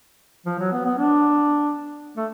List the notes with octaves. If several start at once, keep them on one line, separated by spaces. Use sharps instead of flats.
F3
F#3
B3
B3
D4
A3